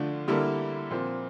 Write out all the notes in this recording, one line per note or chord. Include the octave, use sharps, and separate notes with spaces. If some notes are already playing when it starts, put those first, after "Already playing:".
Already playing: D3 F3 A3 D4 F4
D3 G3 A#3 E4 A4
A#2 F3 C4